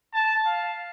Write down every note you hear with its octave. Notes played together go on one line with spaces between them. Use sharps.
A5
F5